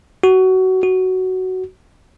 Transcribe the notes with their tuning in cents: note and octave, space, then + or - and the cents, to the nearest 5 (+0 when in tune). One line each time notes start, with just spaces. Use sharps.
F#4 +20
F#4 +10